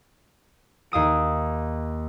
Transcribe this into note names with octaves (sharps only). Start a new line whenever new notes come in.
D#2 F5 D#6 D7